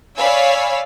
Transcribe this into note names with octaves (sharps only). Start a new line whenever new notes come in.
C#5 D5 F5 G#5 B5 E6